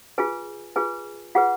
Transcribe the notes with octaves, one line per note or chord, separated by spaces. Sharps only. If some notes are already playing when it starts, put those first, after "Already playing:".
F4 G#4 B4 G#5
F4 G#4 B4 G#5
F4 G#4 B4 F#5